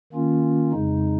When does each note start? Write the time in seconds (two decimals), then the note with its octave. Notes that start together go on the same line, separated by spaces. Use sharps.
0.13 D#3 A#3 C#4 F4
0.72 F2 C#3 G#3 D#4